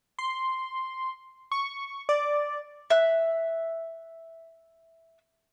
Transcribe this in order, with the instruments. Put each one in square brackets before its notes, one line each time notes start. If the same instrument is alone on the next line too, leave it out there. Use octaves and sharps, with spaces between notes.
[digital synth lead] C6
C#6
D5
[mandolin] E5 F#6